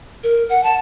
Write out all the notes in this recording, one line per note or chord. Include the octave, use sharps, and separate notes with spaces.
A#4
F#5
A5